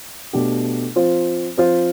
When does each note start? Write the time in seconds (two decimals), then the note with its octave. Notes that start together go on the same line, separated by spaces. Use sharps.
0.33 B2 A3 D4 G4
0.96 F3 C4 F4 C5
1.57 F3 C4 F4 C5